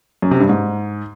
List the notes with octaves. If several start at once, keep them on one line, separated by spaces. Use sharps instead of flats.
F#2
C3
G2
G#2